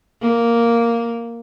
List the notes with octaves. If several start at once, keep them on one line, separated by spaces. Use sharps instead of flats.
A#3